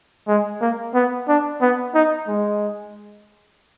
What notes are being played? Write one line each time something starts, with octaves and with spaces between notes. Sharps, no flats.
G#3
A#3
B3
D4
B3
D#4
G#3